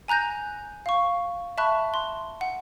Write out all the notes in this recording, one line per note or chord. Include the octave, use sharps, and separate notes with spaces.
G#5 A#5 F#6 G6 A#6
F5 C#6
E5 A5 B5 C#6 F#6
C6
F#5